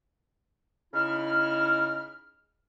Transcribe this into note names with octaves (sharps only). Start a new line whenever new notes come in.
C#3 D#4 E4 F6